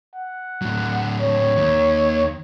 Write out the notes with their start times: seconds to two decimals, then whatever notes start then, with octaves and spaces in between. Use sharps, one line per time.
0.15 F#5
0.62 A2 F#3
1.21 C#5
1.56 D#2 D#3